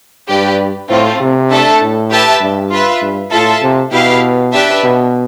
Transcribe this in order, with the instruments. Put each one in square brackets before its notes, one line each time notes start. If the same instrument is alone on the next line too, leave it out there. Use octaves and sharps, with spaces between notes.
[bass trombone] G2 [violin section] G4 B4 D5
[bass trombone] A2 [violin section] A3 C4 F4
[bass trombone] C3
[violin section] A3 D4 A4 E5 A5
[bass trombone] A2
[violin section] G4 B4 E5 A5
[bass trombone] G2
[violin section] F4 B4 E5
[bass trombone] G2
[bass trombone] A2 [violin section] F4 A4 E5 A5
[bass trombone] C3
[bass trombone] B2 [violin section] E4 G4 B4 F5
[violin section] D4 G4 B4 E5 A5
[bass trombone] B2